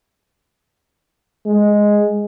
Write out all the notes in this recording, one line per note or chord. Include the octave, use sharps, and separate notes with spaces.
G#3